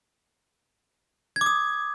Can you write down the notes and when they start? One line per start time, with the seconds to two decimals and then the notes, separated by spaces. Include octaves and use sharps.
1.36 G#6
1.41 D6
1.46 D#6